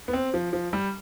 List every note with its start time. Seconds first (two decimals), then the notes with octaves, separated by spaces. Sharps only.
0.08 B3
0.13 C4
0.34 F3
0.53 F3
0.73 G3